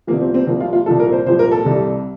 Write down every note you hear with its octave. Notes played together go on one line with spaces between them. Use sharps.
C2 C3 F3 A#3
C4
C4
C2 C3 F3 A#3
F4
F4
C2 A#2 F3 A4
A#4
C5
C2 A#2 F3 C5
A#4
A4
C2 C3 G3